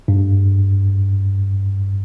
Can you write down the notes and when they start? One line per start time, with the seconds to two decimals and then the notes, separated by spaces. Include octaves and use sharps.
0.08 G2